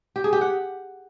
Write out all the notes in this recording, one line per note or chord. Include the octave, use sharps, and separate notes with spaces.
G4
G#4
G4
F#5